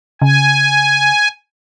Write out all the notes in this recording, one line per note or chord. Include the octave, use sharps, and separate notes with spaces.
C#3 G#5